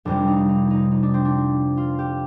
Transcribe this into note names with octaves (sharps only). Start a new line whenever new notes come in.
F1 F2 C3 G3 D4
D#4
D#4
D#4
D#4
D4
C4
D4
F4
G4